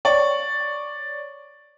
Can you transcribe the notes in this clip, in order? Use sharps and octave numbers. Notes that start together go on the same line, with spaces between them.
C#5 D5 C#6